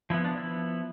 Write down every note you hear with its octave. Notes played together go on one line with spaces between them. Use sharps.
F3 B3 E4
D4
E4